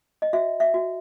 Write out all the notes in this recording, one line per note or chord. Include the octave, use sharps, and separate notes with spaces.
D#5
F#4 E5
E5
F#4